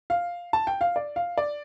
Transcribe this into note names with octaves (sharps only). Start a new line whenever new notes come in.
F5
A5
G5
F5
D5
F5
D5